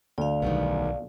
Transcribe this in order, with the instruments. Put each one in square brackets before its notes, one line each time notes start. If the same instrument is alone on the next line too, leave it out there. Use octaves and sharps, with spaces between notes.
[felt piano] D2 [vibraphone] D5 F5
[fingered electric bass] B1 [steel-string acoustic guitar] D#3 G3 B3